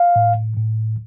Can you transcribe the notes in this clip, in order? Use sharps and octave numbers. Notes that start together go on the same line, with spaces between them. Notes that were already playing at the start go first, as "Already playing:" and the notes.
Already playing: F5
A2
A2